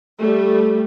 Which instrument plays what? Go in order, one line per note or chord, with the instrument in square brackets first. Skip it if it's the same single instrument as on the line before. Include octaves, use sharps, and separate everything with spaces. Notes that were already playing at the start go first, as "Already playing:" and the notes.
[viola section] G3 A3